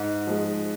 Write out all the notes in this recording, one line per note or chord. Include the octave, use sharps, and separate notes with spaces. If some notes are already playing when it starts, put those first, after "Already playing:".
Already playing: G#2
F3 G#3